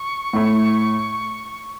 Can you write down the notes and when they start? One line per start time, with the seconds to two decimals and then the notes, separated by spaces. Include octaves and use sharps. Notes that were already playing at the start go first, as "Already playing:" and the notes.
Already playing: C#6
0.33 A2 A3 E4